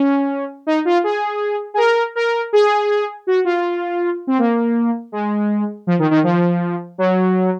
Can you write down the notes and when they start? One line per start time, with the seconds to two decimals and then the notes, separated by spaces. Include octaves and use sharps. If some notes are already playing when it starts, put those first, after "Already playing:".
Already playing: C#4
0.67 D#4
0.85 F4
1.04 G#4
1.74 G#4
1.77 A#4
2.15 A#4
2.53 G#4
3.27 F#4
3.45 F4
4.27 C4
4.39 A#3
5.12 G#3
5.87 F3
5.99 D#3
6.11 D#3
6.23 F3
6.98 F#3